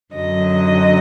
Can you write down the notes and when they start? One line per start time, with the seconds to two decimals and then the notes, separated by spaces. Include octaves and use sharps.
0.14 F#2 D3 F#3 D#5